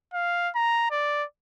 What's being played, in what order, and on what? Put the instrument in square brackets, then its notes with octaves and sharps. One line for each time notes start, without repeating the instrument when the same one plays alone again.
[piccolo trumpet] F5
A#5
D5